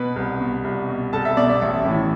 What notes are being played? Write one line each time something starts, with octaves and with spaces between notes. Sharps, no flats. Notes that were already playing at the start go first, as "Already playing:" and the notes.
Already playing: B2 B4 B5
C2
B2
C2
B2
C2 A4 A5
E5
B2 D5
E5
A1 E5
A2 E3